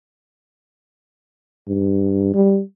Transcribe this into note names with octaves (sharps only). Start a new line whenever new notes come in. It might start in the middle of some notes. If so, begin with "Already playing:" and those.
G2
G3